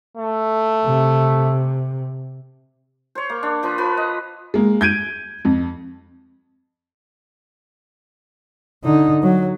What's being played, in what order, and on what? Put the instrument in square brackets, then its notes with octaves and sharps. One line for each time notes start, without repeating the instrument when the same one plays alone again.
[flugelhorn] A3
[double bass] C3
[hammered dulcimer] C5 C#5
A#3
D4
F3 B4 C#6
F3 B4 C#5 B5
D#5
[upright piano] G#3 A#3
G6 G#6 D7 D#7
F2
[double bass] D3 D#4
F#3